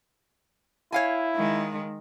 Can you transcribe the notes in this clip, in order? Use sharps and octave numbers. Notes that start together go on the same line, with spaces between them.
E4 C#5 F5 G#5
D#3 G#3